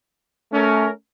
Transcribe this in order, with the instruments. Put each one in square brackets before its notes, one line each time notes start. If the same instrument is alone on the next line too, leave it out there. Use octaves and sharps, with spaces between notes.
[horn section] A3 C#4 A#4